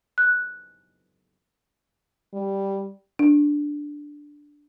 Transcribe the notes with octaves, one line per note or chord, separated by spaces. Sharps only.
F#6
G3
D4